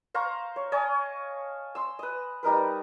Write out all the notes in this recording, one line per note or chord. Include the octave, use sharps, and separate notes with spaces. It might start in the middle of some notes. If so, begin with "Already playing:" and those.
C5 F5 A#5 C#6
C#5
C#5 D#5 G#5 A5
C6 E6
B4 D#5
G3 D#4 A#4 B4